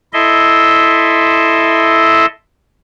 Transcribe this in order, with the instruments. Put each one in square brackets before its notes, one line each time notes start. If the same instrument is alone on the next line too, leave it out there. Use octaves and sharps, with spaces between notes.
[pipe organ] E4 A4 D#5 E5 C6